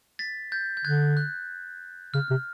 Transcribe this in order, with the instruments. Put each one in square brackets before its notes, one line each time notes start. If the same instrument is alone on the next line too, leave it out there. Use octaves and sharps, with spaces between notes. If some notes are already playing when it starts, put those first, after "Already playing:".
[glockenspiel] A6 B6
G6 A6
G6
[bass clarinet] D3 [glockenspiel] F#6 G#6
[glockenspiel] F#6
[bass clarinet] C#3 [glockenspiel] F6
[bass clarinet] C3